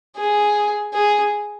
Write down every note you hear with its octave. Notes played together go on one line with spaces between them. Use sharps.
G#4
G#4